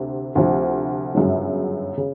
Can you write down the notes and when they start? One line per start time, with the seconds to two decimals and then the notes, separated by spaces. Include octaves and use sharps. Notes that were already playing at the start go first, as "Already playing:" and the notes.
Already playing: D2 C3
0.35 D2 C3 F3
1.15 G1 F#2 C#3 F#3
1.97 C#3